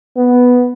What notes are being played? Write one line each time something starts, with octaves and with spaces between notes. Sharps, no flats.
B3